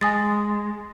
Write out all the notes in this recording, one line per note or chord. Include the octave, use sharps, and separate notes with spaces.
G#3 G#5 D#6 A6